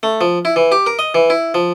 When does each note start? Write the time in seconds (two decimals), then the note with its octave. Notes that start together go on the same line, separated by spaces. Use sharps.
0.03 A3
0.21 F3
0.45 E4
0.56 E3
0.72 G4
0.87 A#4
0.99 D#5
1.15 E3
1.30 E4
1.54 F3